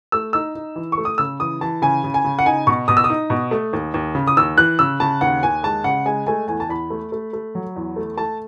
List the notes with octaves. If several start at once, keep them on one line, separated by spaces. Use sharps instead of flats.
A3 E6
D#4 E6
D#4
E3
C#6
A3
D#6
C#3 E6
E3 D#6
E3 A5
C#3 G#5
C#3
G#5
C#3
F#5
D#4 G#5
B2 C#6
B2 D#6
E6
D#6
D#4
B2
A3
D#2
D#2
C#3
D#6
D#2 E6
E3 F#6
C#3 E6
C#3 A5
D#2 F#5
D#2 G#5
G#3 A5
C#3 F#5
G#3 G#5
A3 G#5
E2 G#5
A5
E2 B5
A3
A3
A3
F#3
E2
A3
A3 A5